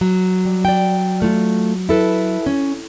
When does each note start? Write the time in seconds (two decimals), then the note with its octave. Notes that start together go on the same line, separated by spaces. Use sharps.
0.01 F#3
0.45 G3
0.65 D5 G5
1.22 A3 F4
1.89 E4 A4 B4
2.46 C#4